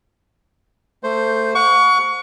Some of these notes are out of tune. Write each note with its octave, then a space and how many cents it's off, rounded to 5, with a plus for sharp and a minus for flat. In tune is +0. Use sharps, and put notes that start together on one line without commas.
A3 +20 C5 +0
F#5 -30 C#6 +25